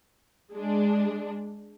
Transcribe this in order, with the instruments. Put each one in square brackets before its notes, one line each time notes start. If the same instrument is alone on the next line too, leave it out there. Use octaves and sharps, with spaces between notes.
[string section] G#3 D4